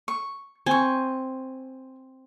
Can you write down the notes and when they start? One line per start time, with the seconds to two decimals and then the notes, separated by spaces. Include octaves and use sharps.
0.08 C#6
0.66 C4 G#5 C#6